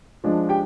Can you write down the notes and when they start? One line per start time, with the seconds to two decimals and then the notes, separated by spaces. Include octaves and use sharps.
0.24 F3 G#3 D4
0.49 G4 G5